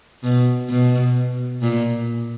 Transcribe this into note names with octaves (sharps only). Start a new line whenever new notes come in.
B2
B2
A#2